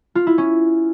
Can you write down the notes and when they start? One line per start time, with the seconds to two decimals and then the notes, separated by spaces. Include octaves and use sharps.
0.15 F4
0.27 E4
0.38 C#4